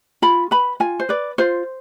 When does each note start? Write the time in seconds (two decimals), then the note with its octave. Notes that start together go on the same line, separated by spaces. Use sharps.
0.22 F4 B5
0.51 B4 B5
0.80 F4 G#5
1.00 C5
1.09 B4 D5
1.38 F4 C5